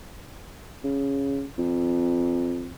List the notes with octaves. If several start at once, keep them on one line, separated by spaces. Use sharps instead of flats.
C#3
F2